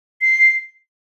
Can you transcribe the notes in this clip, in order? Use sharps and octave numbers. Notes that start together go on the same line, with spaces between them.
C7